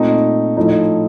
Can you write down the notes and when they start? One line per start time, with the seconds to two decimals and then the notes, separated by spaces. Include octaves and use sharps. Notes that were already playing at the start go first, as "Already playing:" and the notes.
Already playing: A#2 A3 C4 D#4
0.57 A2 F3 A3 D#4